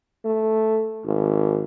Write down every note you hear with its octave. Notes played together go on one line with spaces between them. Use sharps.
A3
G#1